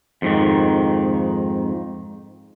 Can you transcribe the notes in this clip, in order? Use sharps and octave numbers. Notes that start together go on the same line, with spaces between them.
F2 G#2 D#3